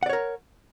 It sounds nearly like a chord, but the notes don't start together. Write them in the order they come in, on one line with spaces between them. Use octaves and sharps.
F#5 D5 C#5 A#4